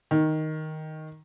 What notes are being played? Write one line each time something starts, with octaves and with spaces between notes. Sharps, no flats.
D#3